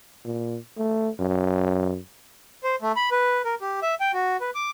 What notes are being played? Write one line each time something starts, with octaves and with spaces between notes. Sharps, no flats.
A#2
A3
F#2
C5
A3
B5
B4
A#4
G4
E5
G5
F#4
B4
D6